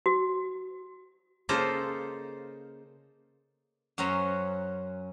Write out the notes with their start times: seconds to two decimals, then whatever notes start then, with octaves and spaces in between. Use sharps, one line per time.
0.06 F#4
1.49 C#3 A#3 D#4 F4 A4 C5
3.98 F#2 F#3 C#4 C5 A#5